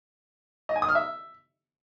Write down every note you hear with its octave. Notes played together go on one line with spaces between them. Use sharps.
D#5
G#5
D#6
F6
E5